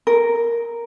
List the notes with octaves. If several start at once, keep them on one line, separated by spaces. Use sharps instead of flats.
A#4